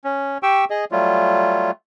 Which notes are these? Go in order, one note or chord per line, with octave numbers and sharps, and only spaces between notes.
C#4
G4 G5 C#6 E6
G#4 D#5
F#3 G3 A3 F4